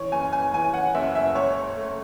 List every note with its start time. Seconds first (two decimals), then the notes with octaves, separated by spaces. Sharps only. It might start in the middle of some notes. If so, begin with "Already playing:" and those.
Already playing: E3 C#5
0.12 F#1 G#5
0.33 G#5
0.54 E3 G#5
0.74 F#5
0.95 F#1 E5
1.15 E5
1.35 C#2 C#5
1.76 A3